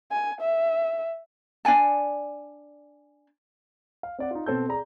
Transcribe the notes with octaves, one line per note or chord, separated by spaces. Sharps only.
G#5
E5
D4 D5 G#5 A5
F5
C4 D5 F#5
D#4 F4
B2 C4 A4 G6
G#4 D5 A#5